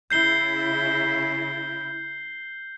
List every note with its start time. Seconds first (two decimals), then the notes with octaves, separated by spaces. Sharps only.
0.10 C#3 E4 G6 C7 G7